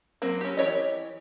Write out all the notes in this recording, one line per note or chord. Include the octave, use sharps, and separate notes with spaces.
F#3 A#3 C4
C#4 G4
E3 G4 C#5 D#5